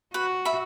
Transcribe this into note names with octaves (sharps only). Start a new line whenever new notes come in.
F#4 B4
E5 B5